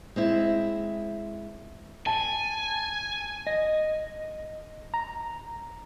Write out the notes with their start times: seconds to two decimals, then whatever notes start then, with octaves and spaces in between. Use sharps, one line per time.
0.16 G#3 C4 E4
2.06 G#5 A5
3.47 D#5
4.94 A#5